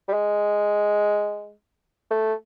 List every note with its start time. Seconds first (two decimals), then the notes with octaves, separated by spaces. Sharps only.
0.08 G3
0.13 G#3
2.11 A3